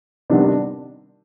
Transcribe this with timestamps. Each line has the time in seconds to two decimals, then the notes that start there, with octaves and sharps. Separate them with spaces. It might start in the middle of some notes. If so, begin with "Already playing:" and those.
0.30 C3 D#3 G3 B3 D4
0.45 D4